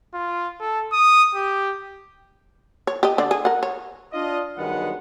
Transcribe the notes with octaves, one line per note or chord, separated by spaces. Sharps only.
F4
A4
D#6
G4
C#5
G4 D#5
D3 D5
G#4
A#4 F#5
C#5
D4 F4 D#5
G2 D#3 F#3 G#3 B3 F#5